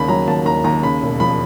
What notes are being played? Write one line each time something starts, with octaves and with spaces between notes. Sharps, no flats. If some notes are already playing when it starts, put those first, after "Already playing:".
Already playing: D#2 C#3 B5
F#3 A#5
D#2 A5
D#2 A#5
D#2 A#5
C#3 B5
E1
F3 B5